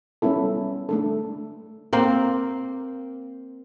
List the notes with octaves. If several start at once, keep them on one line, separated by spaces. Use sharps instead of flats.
G3 B3 C#4 E4 A4
A3 D4 A4
A#3 C4 C5